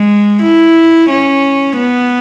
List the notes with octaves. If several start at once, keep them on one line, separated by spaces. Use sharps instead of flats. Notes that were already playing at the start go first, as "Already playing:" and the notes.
Already playing: G#3
E4
C#4
B3